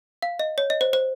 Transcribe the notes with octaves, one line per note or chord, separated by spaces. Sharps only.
F5
D#5
C#5
D#5
C5
C5